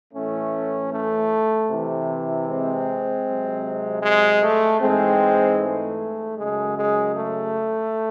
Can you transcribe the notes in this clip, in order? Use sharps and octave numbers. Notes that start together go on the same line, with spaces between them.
A2 E3 A3 C#4
A3
C3 E3
G#3 C4
C3 F#3
G#3
A3
G#2 E3 G#3 C4
A3
F#2 C#3 F#3 G#3
G#3
A3